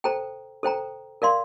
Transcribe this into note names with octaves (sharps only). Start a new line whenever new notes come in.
A4 C5 G5 A#5
A4 C5 G5 A#5
A#4 D5 F5 C6